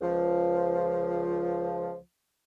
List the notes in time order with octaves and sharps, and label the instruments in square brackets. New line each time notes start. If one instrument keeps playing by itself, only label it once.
[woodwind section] C#2 F3